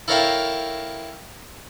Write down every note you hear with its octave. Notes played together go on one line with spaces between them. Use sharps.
E4 A4 A#4 C#5 F5 G5